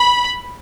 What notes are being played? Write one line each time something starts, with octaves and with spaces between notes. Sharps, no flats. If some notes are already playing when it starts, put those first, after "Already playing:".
Already playing: B5